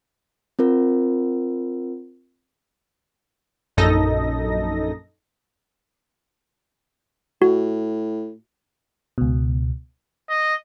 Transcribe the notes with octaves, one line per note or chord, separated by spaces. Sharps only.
C4 F4 A#4
A#1 F#2 D#4 A4 D#5 A#6
A2 F#4
C#2 B2
D#5